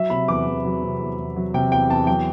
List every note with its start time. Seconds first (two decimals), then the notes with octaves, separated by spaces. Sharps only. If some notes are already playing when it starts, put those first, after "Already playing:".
Already playing: F#3 E5
0.10 C3 B5
0.28 E2 D6
0.47 E2
0.65 F#3
0.83 C3
1.00 E2
1.17 E2
1.36 F#3
1.54 C3 G5
1.72 E2 G5
1.89 E2 A5
2.07 F#3 G5